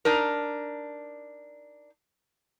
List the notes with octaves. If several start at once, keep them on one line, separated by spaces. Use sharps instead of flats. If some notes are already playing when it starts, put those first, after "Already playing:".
D4 D#4 A#4